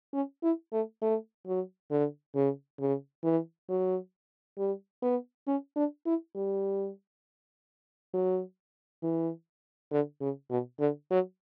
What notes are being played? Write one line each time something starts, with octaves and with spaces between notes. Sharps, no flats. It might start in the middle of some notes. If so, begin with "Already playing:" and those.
C#4
E4
A3
A3
F#3
D3
C#3
C#3
E3
F#3
G3
B3
C#4
D4
E4
G3
F#3
E3
D3
C#3
B2
D3
F#3